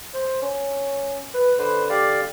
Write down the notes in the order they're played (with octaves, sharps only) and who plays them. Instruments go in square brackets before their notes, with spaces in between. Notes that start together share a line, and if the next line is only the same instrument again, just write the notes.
[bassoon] C5
C#4
B4
[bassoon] D3 [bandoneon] B4 C5
[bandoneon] G4 D5 F5